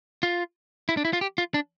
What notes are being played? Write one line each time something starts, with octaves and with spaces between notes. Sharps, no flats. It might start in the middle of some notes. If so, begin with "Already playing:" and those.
F4
E4
D4
E4
F4
G4
F4
D4